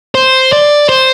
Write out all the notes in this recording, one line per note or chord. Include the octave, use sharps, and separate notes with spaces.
C5
D5
C5